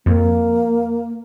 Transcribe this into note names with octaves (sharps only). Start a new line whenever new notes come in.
F2 A#3